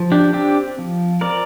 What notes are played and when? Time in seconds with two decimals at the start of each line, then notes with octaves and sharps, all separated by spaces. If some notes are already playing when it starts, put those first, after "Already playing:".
Already playing: F3
0.12 D4 G4
0.33 C4 D4 G4
0.78 F3
1.21 C4 A#4 D5